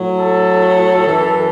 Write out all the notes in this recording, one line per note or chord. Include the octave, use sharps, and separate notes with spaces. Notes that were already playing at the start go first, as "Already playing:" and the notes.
Already playing: A2 F#3
A4
F#2 E3